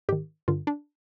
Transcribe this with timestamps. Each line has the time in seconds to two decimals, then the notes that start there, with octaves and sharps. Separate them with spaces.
0.09 G#2 D#3 G4
0.48 G2 D3 F4
0.67 D4